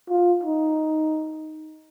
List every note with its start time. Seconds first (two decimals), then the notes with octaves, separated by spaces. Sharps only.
0.10 F4
0.43 D#4